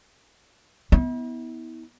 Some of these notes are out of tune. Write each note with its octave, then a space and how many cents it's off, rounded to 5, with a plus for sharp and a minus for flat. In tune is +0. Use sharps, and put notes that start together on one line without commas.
B3 +0 E4 -40